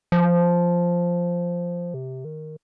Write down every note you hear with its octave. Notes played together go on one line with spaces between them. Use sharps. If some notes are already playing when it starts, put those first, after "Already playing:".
F3
C3
D#3